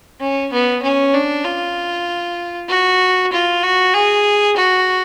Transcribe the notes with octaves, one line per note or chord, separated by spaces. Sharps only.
C#4
B3
C#4
D4
F4
F#4
F4
F#4
G#4
F#4